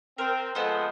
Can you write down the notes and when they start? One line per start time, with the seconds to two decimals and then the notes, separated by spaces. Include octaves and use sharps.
0.18 C4 A#4
0.55 F3 G#3 B3 A4 C5